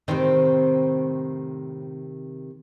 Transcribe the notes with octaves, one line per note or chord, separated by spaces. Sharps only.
A2 C3 D#3 C4 C5